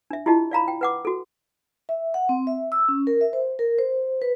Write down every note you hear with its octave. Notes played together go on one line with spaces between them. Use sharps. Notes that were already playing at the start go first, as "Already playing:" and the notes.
D4 E5
E4 F4 G4 D#5 A5
D5 F5 A#5 B5
G5
B4 F#5 D6
F#4 A4
E5
F#5
C4
E5
E6
C#4
A#4
E5
C5
A#4
C5
B4